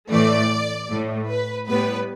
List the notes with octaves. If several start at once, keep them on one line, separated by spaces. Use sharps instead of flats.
A2 E3 A3 D5
A2 A3
B4
A2 G3 B3 B4